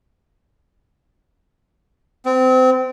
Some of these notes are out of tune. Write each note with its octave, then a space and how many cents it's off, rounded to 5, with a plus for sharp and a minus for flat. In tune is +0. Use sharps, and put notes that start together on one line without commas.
C4 -25